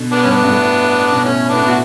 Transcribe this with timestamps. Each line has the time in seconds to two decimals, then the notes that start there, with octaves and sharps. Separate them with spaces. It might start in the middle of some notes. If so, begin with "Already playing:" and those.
Already playing: B2 D3
0.12 B3 D4
0.24 G2 C#4
0.30 B3 D4
0.44 G2
0.49 A2
1.13 B2
1.24 A2 C#4
1.49 B3 D4
1.54 A2
1.62 B2
1.67 F#4